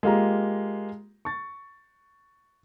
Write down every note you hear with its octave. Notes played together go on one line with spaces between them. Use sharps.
G#3 A#3 F4 G4 A#5
C#6 A6